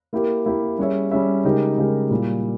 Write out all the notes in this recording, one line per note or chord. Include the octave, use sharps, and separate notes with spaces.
A#3 E4 G4 A#4
A#3 E4 G4 A#4
G3 C#4 G#4 C#5 E5
G3 C#4 G#4 C#5 E5
C#3 G#3 D#4 G4 A#4
C#3 G#3 D#4 G4 A#4
A#2 G3 A#3 E4